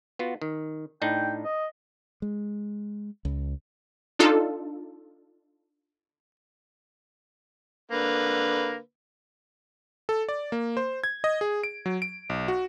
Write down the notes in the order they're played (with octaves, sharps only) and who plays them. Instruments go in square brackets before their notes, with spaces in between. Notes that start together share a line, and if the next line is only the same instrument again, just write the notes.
[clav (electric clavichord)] B3 F4 F#4
D#3
[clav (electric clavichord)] A2 D4 D#4 [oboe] G5
[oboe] D#5
[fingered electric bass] G#3
C#2
[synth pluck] D4 D#4 F4 A4
[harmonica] D3 A#3 B4
[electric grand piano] A4
D5
A#3
C5
G#6
D#5
G#4
D7
F#3
D7
B1
F#4